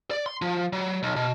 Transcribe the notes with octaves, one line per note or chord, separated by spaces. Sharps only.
D5
C6
F3
F#3
B1
B2